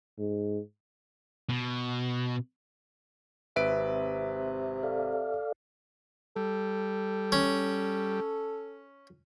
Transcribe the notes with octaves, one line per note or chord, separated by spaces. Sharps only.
G#2
B2
G#1 C3 B4 E5 D7
A4 D5 F5
G3 A4
C#4